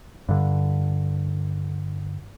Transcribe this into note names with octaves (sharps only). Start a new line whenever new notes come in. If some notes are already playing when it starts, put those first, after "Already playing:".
G2 D3